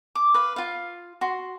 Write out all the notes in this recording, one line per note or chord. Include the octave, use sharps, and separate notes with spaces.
D6
B4 F5
F4 F5
F#4 C6